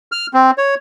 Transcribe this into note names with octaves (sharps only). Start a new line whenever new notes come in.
F6
C4
C#5